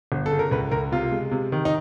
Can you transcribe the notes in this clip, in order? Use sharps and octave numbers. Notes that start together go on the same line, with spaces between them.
G1
A4
C#3
A#4
C#2 B4
C#2 A#4
C3 F4
G#3
C3
D#3
D#4